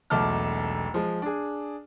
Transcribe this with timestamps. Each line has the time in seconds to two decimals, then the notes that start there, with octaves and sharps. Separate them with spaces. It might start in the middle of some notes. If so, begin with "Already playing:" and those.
0.10 E1 B1 A3 A5 D6 F6
0.94 F3 G#3
1.22 D4 G#4